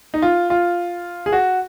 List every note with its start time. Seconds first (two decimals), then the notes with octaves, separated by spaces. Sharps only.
0.14 D#4
0.22 F4
0.50 F4
1.26 G#4
1.32 F#4